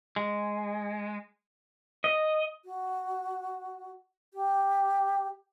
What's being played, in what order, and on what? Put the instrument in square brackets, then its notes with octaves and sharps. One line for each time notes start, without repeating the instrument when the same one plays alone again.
[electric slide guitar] G#3
[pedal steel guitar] D#5
[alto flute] F#4
G4